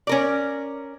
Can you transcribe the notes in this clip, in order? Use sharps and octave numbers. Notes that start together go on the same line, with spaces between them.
C#4 A#4 D5